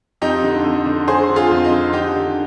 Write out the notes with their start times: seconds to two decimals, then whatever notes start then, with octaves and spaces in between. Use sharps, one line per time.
0.22 F2 D#4 G4
0.43 D3
0.65 F2
0.86 D3
1.08 D3 G#4 C5
1.29 D3
1.36 F4 G#4
1.51 F2
1.64 D#4
1.72 D3
1.93 D3 D#4 G4
2.15 D3